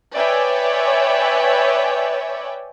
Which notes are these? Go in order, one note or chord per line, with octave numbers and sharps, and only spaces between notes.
B4 C#5 D5 E5 G5 G#5